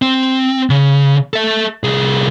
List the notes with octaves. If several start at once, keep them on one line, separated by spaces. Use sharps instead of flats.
C4
C#3
A4 E5
C2 G#4